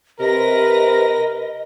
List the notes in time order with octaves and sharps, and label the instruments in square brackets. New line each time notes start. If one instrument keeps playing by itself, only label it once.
[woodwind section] C3 [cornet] A#4 [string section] B4 A#6 [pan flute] D#5